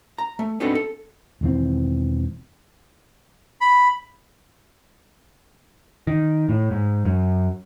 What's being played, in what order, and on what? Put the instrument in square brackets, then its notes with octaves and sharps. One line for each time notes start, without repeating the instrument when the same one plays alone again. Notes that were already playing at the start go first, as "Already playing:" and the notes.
[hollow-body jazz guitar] A#5
A3
B3 C4 D4 D#4 F#4 A4
A4
[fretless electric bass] E1 D#3 E3 C4
[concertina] B5
[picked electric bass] D#3
A2
G#2
F#2